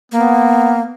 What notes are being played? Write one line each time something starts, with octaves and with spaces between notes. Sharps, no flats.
A#3 B3